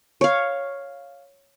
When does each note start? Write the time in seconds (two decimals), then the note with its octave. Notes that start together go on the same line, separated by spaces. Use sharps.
0.21 C#5 F5